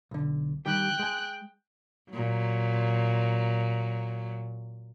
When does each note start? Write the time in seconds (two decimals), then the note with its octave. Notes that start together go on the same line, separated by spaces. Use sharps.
0.11 B1 D3
0.66 D#3 G3 G4 G5 F#6
0.99 G#3 G#5
2.12 A#2 F#3